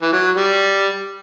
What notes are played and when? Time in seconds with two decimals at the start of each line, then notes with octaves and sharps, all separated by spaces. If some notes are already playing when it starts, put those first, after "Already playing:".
0.02 E3
0.12 F#3
0.37 G3